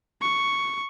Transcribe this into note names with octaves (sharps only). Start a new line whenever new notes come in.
C#6